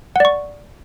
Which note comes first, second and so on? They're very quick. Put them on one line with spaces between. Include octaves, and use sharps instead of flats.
F#5 D5 C#6